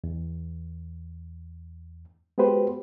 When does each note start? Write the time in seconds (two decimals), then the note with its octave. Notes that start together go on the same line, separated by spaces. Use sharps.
0.04 E2
2.38 G#3 B3 F#4 G4 B4 C5